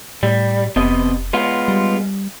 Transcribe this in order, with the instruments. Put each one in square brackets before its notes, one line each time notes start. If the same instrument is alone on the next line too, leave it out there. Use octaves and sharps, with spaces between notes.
[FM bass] A2 [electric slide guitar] G3
[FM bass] F1 [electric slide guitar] C3 B3 D#5
[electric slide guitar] G#3 B3 F4
[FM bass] G3